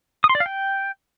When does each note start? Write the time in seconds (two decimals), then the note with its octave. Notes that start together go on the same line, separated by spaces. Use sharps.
0.24 D#6
0.29 C6
0.35 D5
0.40 F5
0.46 G5